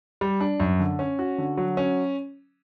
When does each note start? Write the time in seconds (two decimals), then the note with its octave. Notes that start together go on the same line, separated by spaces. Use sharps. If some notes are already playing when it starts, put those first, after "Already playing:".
0.21 G3
0.41 D4
0.60 F#2
0.80 D3
0.99 C#4
1.19 F#4
1.38 D3
1.57 F#3
1.77 C#4